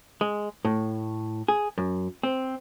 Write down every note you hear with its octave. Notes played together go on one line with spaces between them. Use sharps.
G#3
A2
G#4
F#2
C4